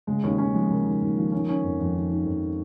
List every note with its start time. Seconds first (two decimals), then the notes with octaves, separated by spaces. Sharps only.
0.07 C#3 G#3
0.23 D#2 C#4
0.38 D#2 C#4
0.54 F3 G#3
0.70 C#3 A#3
0.86 D#2
1.01 D#2
1.17 F3
1.32 D#3 C#4
1.40 A#3
1.48 D#3 C#4
1.63 F2
1.80 F2
1.94 D#3
2.11 D#3
2.26 F2